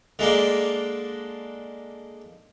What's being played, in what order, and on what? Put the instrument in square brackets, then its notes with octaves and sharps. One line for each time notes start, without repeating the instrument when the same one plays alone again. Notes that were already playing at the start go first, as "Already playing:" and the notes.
[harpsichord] D3 G#3 A#3 D4